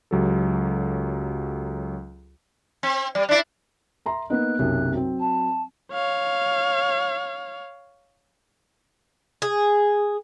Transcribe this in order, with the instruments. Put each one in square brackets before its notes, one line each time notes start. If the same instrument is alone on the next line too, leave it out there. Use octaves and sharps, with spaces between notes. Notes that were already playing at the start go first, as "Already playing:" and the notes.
[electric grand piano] C#2 F#3 G4 A4
[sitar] C4
[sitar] G3 [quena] D5
[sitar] D4 E4 [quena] D5
[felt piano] E5 A#5 C6
[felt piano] A#3 B3 D#4 [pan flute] F#6
[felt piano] B1 F#2 C3
F#3 C4
[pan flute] A5
[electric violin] C#5 F5
[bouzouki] G#4